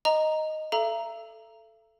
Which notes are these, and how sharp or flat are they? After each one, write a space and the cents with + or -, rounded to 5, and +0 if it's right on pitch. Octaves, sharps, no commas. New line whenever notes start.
D#5 +0 A#5 +0
A4 +0 E5 +45 A#5 +0